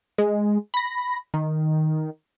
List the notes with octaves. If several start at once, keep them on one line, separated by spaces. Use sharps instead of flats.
G#3
B5 A#6
D#3